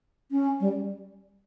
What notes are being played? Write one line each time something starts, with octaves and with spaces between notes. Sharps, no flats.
C#4
G3